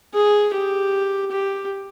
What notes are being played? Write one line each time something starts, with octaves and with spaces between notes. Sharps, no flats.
G#4
G4
G4